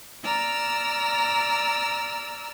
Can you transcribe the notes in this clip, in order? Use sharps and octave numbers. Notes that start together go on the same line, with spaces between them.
D5 A#5 E6 F6